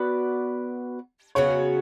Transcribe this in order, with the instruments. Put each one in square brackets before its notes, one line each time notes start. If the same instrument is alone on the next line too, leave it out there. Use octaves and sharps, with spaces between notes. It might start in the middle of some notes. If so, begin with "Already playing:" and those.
Already playing: [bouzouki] B3 F#4 B4 D5
[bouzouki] C#3 F#3 B3 F#4 [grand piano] C#5